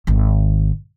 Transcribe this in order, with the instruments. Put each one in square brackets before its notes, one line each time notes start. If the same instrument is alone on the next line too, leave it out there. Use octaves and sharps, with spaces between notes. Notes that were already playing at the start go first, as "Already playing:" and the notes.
[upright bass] G#1 D#3